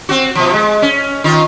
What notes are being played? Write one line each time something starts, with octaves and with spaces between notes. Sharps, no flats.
C4 F#4
B2 F3
G#3
C#4
D#3 F4